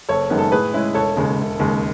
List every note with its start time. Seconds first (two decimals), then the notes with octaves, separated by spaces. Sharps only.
0.09 F#1 A4 C#5
0.30 F#2 D#3 G#3 B3
0.38 A4
0.52 A2 G#4 B4
0.73 G#3 C#4 E4
0.94 E1 A4 C#5
1.17 D#2 C#3 G#3
1.39 E1
1.59 D#2 C#3 G#3